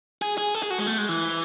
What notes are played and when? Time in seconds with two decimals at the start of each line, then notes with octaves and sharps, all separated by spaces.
0.22 G#4
0.38 G#4
0.55 A4
0.63 G#4
0.70 F#4
0.78 G#3
0.87 A3
0.98 G#3
1.09 E3